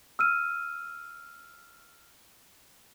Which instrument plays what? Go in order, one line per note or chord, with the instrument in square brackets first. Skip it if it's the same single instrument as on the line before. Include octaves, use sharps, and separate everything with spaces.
[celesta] E6 F6 D#7